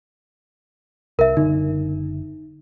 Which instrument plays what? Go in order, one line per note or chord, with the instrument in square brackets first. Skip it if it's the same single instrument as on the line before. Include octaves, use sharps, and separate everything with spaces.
[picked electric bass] C2 [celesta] A#4 E5
[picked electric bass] F#1 D3 [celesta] D#4